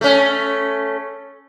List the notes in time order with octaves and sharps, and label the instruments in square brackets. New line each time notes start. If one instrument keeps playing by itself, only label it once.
[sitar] A3 C#4